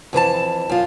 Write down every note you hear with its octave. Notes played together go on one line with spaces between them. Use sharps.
F2 E3 G#4 A5
F#2 F4